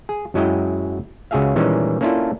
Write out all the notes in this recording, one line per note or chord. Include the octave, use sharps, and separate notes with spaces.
G#4
F#2 F#3 G#3 E4 D#5 G5
C#2 C#3 F#4 G#4 E5 F5
A#2 D#3 E3 G3 G#3 C#4
A#3 C#4 D4 E4 F4 A4